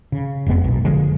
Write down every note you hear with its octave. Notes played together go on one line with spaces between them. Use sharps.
C#3
F1 F2 G#3 B3
B1 A#2
F#1 D3 F3 G#3